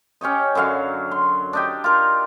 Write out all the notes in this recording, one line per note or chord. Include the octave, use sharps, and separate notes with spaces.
C#4 G4 C#5 D#5
F#2 D3 F#3 F5
C6
D4 D#4 G4
F4 A#4